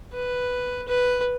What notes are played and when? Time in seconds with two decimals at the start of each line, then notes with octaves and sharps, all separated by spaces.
0.13 B4
0.88 B4